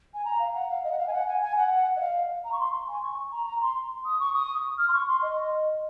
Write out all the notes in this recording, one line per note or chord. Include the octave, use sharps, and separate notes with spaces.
G#5
A#5
F5
F#5
F5
D#5
F#5
F5
G#5
F#5
G#5
G#5
F#5
D#5
F5
A#5
C#6
C6
G#5
C#6
A#5
A#5
C6
D#6
C#6
D#6
F6
C6
C#6
C6
D#5